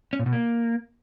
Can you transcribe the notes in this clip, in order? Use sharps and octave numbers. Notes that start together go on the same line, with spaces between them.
C#4
A#2
B2
A#3